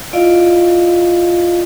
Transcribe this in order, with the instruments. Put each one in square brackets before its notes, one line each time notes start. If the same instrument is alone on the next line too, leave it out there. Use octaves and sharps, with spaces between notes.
[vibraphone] E4 F4 D5 D#5 F5